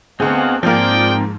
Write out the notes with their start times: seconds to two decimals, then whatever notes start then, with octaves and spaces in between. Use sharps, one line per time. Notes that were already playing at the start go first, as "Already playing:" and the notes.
0.20 D2 B3 C4 G#4 D#5 F5 F#5
0.63 G#2 F3 A#3 C4 G#4 D5 G5 F6